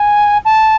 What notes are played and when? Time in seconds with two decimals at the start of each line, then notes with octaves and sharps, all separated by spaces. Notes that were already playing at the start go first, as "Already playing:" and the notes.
Already playing: G#5
0.45 A5